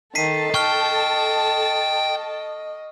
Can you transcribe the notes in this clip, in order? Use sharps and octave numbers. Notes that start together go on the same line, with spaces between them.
D#3 A4 A5 B6 C7 D#7
D#5 G5 C#6 F6 G7